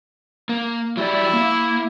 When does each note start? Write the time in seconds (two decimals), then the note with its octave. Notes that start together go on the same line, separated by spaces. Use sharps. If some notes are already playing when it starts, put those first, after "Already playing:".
0.49 A#3
0.97 F#3 E4 G4 D5
1.33 A#3